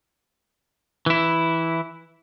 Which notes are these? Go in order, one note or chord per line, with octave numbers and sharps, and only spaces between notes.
E3 E4